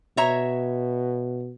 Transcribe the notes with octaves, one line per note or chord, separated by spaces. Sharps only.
B2 C#5 E5 A#5